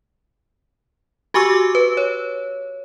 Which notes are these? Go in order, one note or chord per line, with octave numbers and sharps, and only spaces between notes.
F#4 G4 G#5 C#6 D6 E6
B4
C#5